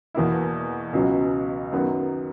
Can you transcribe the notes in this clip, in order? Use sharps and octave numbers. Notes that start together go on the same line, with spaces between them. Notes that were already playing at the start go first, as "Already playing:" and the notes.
E2 B2 A#3 E4
C#2 B2 F#3 C#4
F#2 D#3 F#3 B3